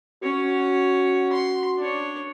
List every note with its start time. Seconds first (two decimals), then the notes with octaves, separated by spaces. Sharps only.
0.23 C#4 F#4 C#5
1.33 C6
1.78 D4 C#5